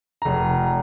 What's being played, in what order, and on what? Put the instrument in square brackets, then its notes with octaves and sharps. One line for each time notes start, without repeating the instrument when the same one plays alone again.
[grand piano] F1 A#5